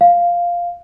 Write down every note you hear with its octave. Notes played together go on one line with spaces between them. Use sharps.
F5